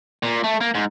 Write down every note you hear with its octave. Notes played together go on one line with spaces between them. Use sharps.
A#2
A3
A#3
G#2